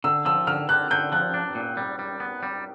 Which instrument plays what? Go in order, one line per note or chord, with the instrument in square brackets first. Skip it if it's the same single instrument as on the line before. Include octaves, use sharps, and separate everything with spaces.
[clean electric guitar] D3 [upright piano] E6
[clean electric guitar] F3 [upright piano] E6
[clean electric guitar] D3 [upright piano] F6
[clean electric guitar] D3 [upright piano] F#6
[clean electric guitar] D3 [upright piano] G6
[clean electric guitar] F3 [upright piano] F#6
[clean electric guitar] D4
A#2
G3
G3
B3
G3